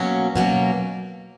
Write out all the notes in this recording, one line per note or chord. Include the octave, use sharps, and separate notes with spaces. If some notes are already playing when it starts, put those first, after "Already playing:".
Already playing: B2 F#3 A#3 C#4
B2 F#3 A#3 C#4